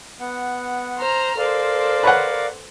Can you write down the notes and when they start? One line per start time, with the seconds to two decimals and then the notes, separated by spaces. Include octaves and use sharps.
0.20 B3 F#5
0.98 C5 A#5 F6
1.38 A4 A#4 C5 D5 F5
2.03 B4 C#5 F#5